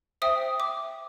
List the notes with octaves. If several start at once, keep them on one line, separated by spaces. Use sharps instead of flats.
C5 E5 G5 D#6
D6